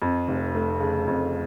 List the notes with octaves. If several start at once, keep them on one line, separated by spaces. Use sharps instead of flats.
F2
F1
A3
C#3
F2